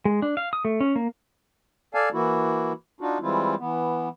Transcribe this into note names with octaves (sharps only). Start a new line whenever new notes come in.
G#3
D4
F5
D#6
A3
C#4
A#3
A4 D5 F5 G#5 A5
E3 A#3 E4 F#4
D4 D#4 F4 F#4
E3 G3 G#3 C4 E4 F4
E3 B3